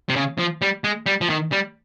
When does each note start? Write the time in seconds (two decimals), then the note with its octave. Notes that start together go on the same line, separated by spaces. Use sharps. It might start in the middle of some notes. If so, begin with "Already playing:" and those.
0.09 C3
0.16 C#3
0.39 F3
0.62 G3
0.84 G#3
1.06 G3
1.21 F3
1.30 D#3
1.52 G3